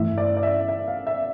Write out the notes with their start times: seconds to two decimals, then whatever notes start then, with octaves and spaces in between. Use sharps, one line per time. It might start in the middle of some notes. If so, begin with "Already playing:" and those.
Already playing: G2 E3 A3 E4 E5
0.18 D5
0.37 D5
0.43 E5
0.69 E5
0.88 F5
1.07 E5